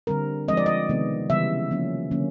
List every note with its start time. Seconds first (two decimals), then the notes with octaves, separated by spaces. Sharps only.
0.07 D3 G3 C4 A#4
0.48 F3 G#3 C4 D#5
0.57 D5
0.66 D#5
0.89 C3 D#3 G#3 B3
1.30 C#3 E3 G3 B3 E5
1.71 F3 A#3 C#4
2.11 D3 F#3 A#3 C#4